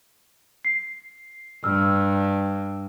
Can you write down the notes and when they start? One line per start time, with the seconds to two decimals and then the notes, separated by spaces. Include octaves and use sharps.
0.65 C7
1.64 G2 E6 F6